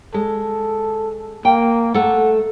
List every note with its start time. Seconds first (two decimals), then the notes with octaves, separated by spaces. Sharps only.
0.14 G#3 A4
1.45 A#3 G5
1.94 A3 A4 F#5